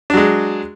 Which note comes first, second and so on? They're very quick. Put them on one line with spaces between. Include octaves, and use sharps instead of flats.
D4 F#3 G#3